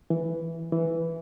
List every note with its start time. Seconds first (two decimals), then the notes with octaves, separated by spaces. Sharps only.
0.10 E3
0.72 E3